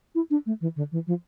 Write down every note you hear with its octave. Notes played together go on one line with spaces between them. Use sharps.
E4
D4
A3
E3
D3
E3
F3